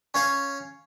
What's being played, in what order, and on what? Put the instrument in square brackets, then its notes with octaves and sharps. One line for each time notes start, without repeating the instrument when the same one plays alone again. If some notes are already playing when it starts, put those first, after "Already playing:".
[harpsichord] C#4 C#5 F5